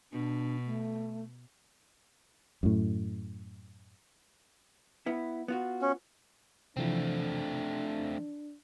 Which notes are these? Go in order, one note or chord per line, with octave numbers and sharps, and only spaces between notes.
B2 D4
A3
F#2 A2
B3 E4
B3 F4 F#4
C#4
C3 E3 F3 A3 C4 D4